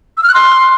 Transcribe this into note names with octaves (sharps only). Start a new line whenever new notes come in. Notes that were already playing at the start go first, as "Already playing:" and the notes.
E6
F6
F#6
C6